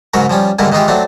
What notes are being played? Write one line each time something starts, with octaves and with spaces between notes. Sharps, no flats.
G#2 C#3 F#3 A#4 C#6
F3 G3 C#4
G2 D3 D#3 G#3 A#3 E4
D#3 E3 G#3 D#4 F4 G4
F#3 A3 C4 D4